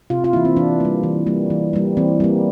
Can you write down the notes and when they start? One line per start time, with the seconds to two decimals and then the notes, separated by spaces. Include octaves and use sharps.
0.10 C3 F4
0.24 F4
0.33 E3 A#3 E4
0.45 C4
0.56 E3 D4
0.80 G3 A#3
1.03 E3
1.27 G3 A#3
1.50 E3
1.73 G3 A#3
1.97 E3 C4
2.20 G3 A#3